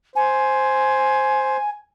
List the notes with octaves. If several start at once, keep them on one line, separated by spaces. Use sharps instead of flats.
C5 G#5